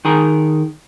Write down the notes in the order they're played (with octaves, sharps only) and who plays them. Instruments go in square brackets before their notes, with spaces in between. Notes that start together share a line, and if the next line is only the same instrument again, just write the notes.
[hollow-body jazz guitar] D#3 G#4 A#4